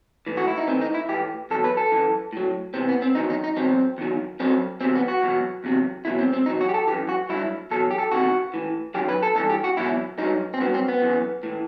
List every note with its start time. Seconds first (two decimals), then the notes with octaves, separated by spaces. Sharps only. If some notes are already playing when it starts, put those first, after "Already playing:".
0.27 A2 E3
0.37 F#4
0.48 E4
0.58 D#4
0.67 A2 E3 C4
0.81 D#4
0.94 E4
1.09 A2 E3 G4
1.51 E2 B2 F#3 A4
1.64 B4
1.77 A4
1.91 F#2 E3
2.33 A2 F#3
2.74 E2 C3 E3 C4
2.89 B3
3.02 C4
3.15 E2 D#3 F#3 D#4
3.30 D#4
3.44 D#4
3.57 E2 B2 F#3 C4
3.98 E2 D#3 F#3
4.40 F#2 F#3 C4
4.81 E2 C3 F#3 C4
4.96 B3
5.08 F#4
5.22 E2 B2 F#3
5.64 E2 C3 F#3
6.05 E2 B2 F#3 E4
6.19 C4
6.33 C4
6.46 E2 B2 F#3 D#4
6.61 F#4
6.69 G4
6.74 A4
6.87 E3 G4
6.93 F#2
7.09 F#4
7.29 G2 F#3 E4
7.71 E2 B2 F#3 A4
7.91 G4
7.98 A4
8.12 E2 C3 D#3 F#4
8.54 A2 E3
8.94 F#2 D#3 F#3 G4
9.09 B4
9.23 A4
9.36 G2 E3 A4
9.50 G4
9.64 F#4
9.77 E2 B2 F#3 E4
10.18 G2 F#3 D#4
10.54 C4
10.60 G2 D#3 F#3 B3
10.74 C4
10.88 B3
11.01 F#2 E3
11.43 A2 E3